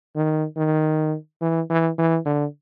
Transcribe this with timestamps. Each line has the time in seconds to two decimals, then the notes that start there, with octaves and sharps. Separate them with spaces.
0.16 D#3
0.57 D#3
1.42 E3
1.70 E3
1.99 E3
2.26 D3